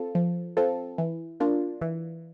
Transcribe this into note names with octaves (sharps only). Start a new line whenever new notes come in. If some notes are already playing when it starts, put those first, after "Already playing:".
Already playing: C4 F4 A4
F3
C4 F4 A4
E3
A#3 D4 F4
E3